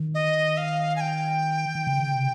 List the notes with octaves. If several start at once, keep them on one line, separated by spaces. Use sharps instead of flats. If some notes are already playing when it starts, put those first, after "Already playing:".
Already playing: D#3
D#5
F5
G#5
G5
D#3
C#3
C3